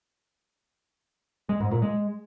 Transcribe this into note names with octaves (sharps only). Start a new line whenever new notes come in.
G#3
G#2
A#2
G#3